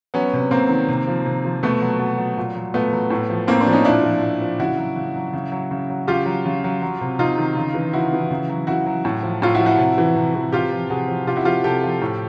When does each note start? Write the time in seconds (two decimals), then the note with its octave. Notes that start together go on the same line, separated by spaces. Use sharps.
0.14 F#3 B3 C#4
0.33 C3
0.51 C3 A#3 C4
0.69 D#3
0.88 C3
1.07 F3
1.26 C3
1.45 F3
1.63 B2 A3 B3
1.82 F#3
1.99 B2
2.18 F#3
2.37 A#2
2.56 F#3
2.74 A#2 A3 B3
2.93 F#3
3.10 A2
3.30 F3
3.48 A2 A#3 C4
3.61 C4 D4
3.67 F3
3.73 C#4 D#4
3.85 A#2 D4 E4
4.04 F3
4.22 A#2
4.41 F3
4.59 C#3 E4 F#4
4.78 F#3
4.96 C#3
5.16 F#3
5.34 C#3
5.52 F#3
5.71 C#3
5.90 F#3
6.07 C#3 F4 G4
6.26 F#3
6.46 C#3
6.64 F#3
6.82 F#3
7.01 C3
7.19 C3 D#4 F4
7.38 D#3
7.57 C#3
7.74 E3
7.93 C#3 E4 F#4
8.12 E3
8.31 C#3
8.49 F#3
8.67 C#3 E4 F#4
8.86 F#3
9.05 A2
9.23 F3
9.42 A2 F4
9.55 E4 F#4
9.61 F3
9.66 E4 F#4
9.78 C3
9.98 E3
10.16 C3
10.35 E3
10.52 C3 F4 G4
10.72 F3
10.90 C3 F#4 G#4
11.09 F3
11.27 C3 F4 G4
11.36 E4 F#4
11.45 F3 F4 G4
11.64 C3 G4 A4
11.83 F3
12.02 A2